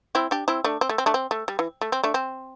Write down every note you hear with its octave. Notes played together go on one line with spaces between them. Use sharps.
C4 E4
D4 G4
C4 E4
A3 D4
C4
A3
C4
A3 D4
C4
A3
G3
E3
A3
C4
A3 D4
C4